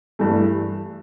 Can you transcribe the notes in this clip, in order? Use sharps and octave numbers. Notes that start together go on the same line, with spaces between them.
G2 E3 A3